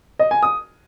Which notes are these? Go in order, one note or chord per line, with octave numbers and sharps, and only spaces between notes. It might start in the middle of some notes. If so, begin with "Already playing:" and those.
D#5
G#5
D#6